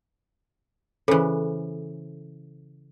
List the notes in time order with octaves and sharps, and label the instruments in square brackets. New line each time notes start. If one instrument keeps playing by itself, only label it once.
[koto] C#3 E3 [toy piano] A4 C5